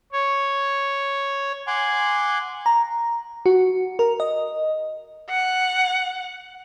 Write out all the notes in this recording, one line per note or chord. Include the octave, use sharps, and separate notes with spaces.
C#5
F#5 G#5 C6 D6
A#5
F#4
A#4
D#5
F#5